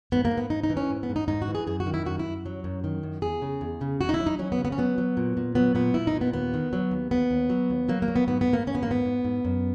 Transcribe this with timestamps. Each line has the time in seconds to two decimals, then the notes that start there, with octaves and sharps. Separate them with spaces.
0.12 G#2 B3
0.25 A#3
0.31 G#2
0.37 B3
0.50 G#2 D#4
0.63 D#4
0.70 E3
0.77 C#4
0.90 G#2
1.03 B3
1.09 G#2
1.16 D#4
1.28 G#2 D#4
1.42 F#4
1.48 E3
1.55 G#4
1.67 F#2 G#4
1.80 F#4
1.86 D#3
1.94 E4
2.05 F#2 F#4
2.19 E4
2.26 F#2
2.46 F#3
2.64 F#2
2.84 D#3
3.03 F#2
3.22 E2 G#4
3.42 C#3
3.61 E2
3.81 C#3
4.01 E2 F#4
4.09 D#4
4.14 E4
4.20 F#3
4.26 D#4
4.39 F#3 C#4
4.52 B3
4.58 C#3
4.65 B3
4.72 C#4
4.78 F#3 B3
4.98 F#3
5.17 A#2
5.37 A#2
5.55 F#3 B3
5.75 A#2 B3
5.94 A#2 E4
6.07 D#4
6.15 A#2
6.21 B3
6.33 D#2 B3
6.54 D#3
6.73 F#3
6.91 D#2
7.11 D#2 B3
7.31 D#2
7.50 F#3
7.70 D#2
7.89 F#3 A#3
8.02 A#3
8.08 F#3
8.16 B3
8.28 G#2 B3
8.41 B3
8.47 G#2
8.53 A#3
8.67 G#2 C#4
8.75 B3
8.83 A#3
8.87 G#2 B3
9.05 G#2
9.25 G#2
9.45 F#2